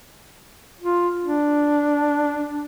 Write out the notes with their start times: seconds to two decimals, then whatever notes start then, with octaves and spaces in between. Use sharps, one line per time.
0.81 F4
1.24 D4